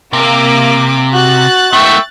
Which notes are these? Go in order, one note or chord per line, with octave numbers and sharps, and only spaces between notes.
C3 A#3 D6
F#4 F#6 A6
A3 B3 E5 G5 C#6